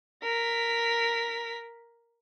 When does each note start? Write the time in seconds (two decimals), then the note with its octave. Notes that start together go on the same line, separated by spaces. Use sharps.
0.23 A#4 B6